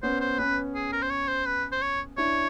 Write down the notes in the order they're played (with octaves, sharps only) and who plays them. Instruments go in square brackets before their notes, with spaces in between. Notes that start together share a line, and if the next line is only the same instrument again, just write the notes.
[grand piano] B3 C#4 [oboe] C5
[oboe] C5
[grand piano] B3 C#4 [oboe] B4
[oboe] G#4
A#4
C5
C#5
C5
B4
C5
C#5
[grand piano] D4 E4 [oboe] C#5